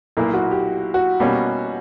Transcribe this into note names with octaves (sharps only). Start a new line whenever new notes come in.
B1 A#2 A#3 E4
F#4
G4
F#4
B2 G3 A#3 C#4